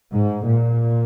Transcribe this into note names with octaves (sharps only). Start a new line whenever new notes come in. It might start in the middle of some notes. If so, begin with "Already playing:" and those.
G#2
A#2